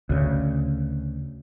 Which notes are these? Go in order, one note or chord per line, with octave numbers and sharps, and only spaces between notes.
D2 C#3